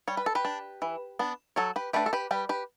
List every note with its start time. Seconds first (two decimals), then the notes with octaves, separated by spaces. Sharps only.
0.08 G3 C#5
0.17 B4
0.26 A4
0.35 G4 B4
0.45 D4
0.82 E3
1.19 B3 D4
1.56 F#3 A4 C#5
1.76 G4 B4
1.93 A3 D4 G4 B4
2.06 A4
2.13 G4 B4
2.31 G3 G4 B4
2.49 G4 B4